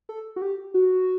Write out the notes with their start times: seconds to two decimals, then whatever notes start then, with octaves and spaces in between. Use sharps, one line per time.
0.09 A4
0.36 F#4
0.42 G4
0.74 F#4